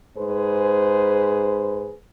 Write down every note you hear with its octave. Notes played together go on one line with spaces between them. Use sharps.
G#2 G#4 B4 C5